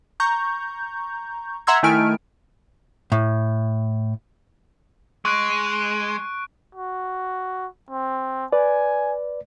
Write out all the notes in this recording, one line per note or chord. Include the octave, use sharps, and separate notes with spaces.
A#5 C#6 G6
E5 F#5 A#5 C6 E6 G#6
D#3 A3 E4 G#5 F6 D7
A2
G#3 C#6 F#6 D7
F#4
C4
B4 D5 G#5